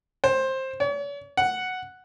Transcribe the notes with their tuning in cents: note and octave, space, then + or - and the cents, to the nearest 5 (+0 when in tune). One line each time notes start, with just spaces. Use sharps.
C5 +15
C#5 +45
F#5 +0